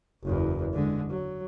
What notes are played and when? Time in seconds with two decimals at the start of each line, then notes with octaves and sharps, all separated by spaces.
0.23 F#1 E2
0.73 D3 G#3
1.10 F#3